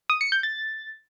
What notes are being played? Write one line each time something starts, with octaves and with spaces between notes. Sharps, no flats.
D#6
C#7
G6
A6